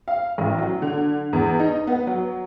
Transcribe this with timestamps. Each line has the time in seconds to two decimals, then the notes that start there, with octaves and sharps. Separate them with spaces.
0.08 F5
0.38 A1
0.58 F#3
0.82 D3
1.33 E2
1.60 D#4
1.87 B3
2.07 F#3